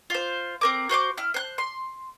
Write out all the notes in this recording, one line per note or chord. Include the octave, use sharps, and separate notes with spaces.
F4 C5
C4 A#4 D6
F#4 C5 C6 D6
E4 F6
C5 F#6
C6